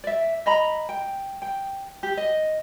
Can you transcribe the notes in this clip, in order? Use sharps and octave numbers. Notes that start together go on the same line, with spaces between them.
D5 E5
D#5 A#5 B5
G5
G5
G4
D#5